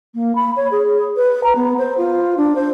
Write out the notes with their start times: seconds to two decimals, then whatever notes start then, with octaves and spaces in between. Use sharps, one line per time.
0.15 A#3
0.35 B5
0.56 C#5
0.71 G#4
1.16 B4
1.44 A#5
1.56 B3
1.78 C5
1.98 F4
2.37 D4
2.55 C5